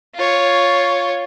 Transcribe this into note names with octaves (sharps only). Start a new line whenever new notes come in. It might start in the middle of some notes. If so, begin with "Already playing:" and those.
F4 C#5